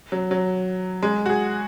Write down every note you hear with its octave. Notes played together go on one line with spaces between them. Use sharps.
F#3
F#3
G#3
F#4
G#4